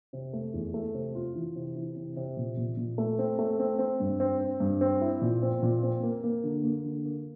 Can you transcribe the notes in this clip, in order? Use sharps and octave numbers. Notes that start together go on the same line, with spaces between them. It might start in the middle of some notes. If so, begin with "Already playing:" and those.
C3
A3
E2
A3
C3
F4
E3
C3
E3
C3
C3
A#2
A#2
A#2
A3
C4
A3
C4
C4
G2
C4
C4
G2
C4
E4
A#2
C4
A#2
C4
A#3
A#3
D3
A#3
D3
A#3